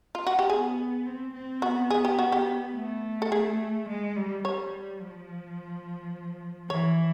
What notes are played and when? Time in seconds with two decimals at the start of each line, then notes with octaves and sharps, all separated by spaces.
0.15 F4
0.27 F#4
0.39 G4
0.50 B3 G#4
1.06 C4
1.34 C4
1.62 B3 F#4
1.90 G#4
2.05 G4
2.19 F#4
2.32 G4
2.75 A3
3.22 A4
3.32 G#4
3.88 G#3
4.16 G3
4.44 G3 C#5
5.00 F3
6.69 E3 C#5